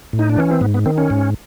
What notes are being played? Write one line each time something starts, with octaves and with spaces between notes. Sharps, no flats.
A2
D#4
D4
E3 C#4
C4
G#2 B3
B3
D#3 C4
C#4
G#2